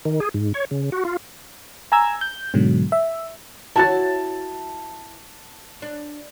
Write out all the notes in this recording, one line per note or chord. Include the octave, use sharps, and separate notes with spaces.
D#3
G#4
G#2
C#5
C#3
F#4
F4
G#5 A#5 E6 G#6
G6
G#2 B2 D3 F#3
E5
E4 F#4 C#5 A5 A6
D4